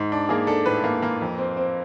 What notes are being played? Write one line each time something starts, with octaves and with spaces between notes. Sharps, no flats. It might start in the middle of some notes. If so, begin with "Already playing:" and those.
Already playing: G#2
D4
A#3 G#4
D4 A4
A2 B4
A#3
A#3
F2
C4
C4